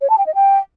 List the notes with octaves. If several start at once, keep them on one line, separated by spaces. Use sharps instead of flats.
C#5
A5
G5
D#5
G5